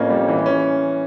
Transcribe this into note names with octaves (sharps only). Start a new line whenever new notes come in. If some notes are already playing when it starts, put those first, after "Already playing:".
Already playing: F2 A2 A#3 C#4
G3
E3
C#4